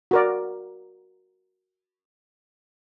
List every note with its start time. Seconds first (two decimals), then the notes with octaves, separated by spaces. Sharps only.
0.11 F#4 A#4 D5